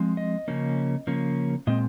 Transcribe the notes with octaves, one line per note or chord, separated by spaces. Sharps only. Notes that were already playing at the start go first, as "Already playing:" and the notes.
Already playing: F3 G#3 C4
D#5
C#3 F3 A#3 C#4
C#3 F3 A#3 C#4
A#2 G#3 C4 D#5